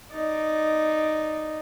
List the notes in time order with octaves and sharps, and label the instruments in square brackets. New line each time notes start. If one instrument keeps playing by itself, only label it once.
[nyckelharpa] D#4 D5